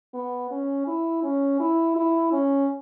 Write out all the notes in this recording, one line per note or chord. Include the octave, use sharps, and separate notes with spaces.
B3
C#4
E4
C#4
E4
E4
C#4